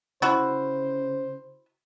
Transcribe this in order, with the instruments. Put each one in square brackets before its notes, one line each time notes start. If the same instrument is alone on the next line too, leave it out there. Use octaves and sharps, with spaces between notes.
[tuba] C#3 [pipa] E4 F#4 [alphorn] C5